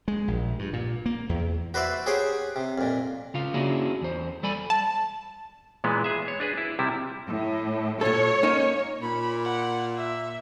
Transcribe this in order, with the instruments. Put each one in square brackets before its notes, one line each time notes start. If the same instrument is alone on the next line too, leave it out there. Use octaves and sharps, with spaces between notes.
[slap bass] G#3
A#1
G2
A#2
A#3
E2
[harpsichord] F#4 B4 C5 D5 E5
G4 G#4 C5 C#5 F#5 G5
C3
F2 A#2
[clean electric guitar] C#3 F4 F5
A#3 C#4 D4 E4 F#4 G#4
E2 C5
G3 A4 D5 G#5 B5
[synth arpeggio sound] A5
[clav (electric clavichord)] A#2 E3 G#3 B3
G#4 E5
C#5
D4 G#4 B4
E4
C3 G3 E4
[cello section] A2
[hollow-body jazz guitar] A#2 A4 [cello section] C#5
[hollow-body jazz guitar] A#3 C#4 D#4
[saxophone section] A#2 [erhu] B5
[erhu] F#5
E5